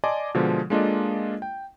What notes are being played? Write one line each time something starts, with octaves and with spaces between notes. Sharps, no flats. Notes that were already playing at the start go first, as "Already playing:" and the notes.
D5 D#5 G#5 A5 C6 D6
B2 D3 F3 G#3
G#3 A#3 D4 F4 A4 D#5
G5